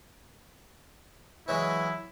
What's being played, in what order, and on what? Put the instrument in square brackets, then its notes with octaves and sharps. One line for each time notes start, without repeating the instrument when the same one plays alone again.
[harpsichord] E3 F#3 G#3 [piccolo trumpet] E4